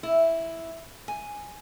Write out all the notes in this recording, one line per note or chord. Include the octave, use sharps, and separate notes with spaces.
E4
G#5